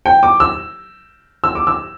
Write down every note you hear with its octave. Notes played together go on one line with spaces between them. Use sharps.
G5
D6
E6
E6
D6
E6